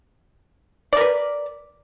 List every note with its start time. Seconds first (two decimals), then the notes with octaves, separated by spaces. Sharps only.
0.93 D5
0.97 A#4
1.01 B4